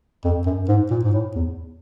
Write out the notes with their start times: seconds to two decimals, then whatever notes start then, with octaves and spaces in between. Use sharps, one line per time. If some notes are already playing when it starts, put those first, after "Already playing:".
0.25 F2
0.46 F#2
0.68 G#2
0.90 A#2
1.04 G#2
1.13 A2
1.35 E2